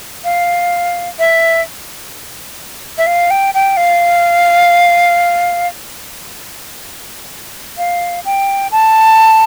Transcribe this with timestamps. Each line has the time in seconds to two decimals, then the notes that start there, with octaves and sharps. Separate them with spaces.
0.24 F5
1.19 E5
2.98 E5
3.07 F5
3.30 G5
3.54 G5
3.77 F5
7.78 F5
8.25 G5
8.71 A5